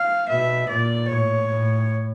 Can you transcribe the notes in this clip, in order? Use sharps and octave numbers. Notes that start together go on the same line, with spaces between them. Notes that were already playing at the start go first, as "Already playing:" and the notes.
Already playing: F5
B2 E5
A#2 D5
A2 C#5
A2